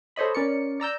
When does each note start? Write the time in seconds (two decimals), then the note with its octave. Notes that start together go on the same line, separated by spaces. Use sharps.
0.16 A4 C5 C#5 D#5 B5
0.35 C#4 A#4 D5 C#7
0.80 D5 A#5 E6 G6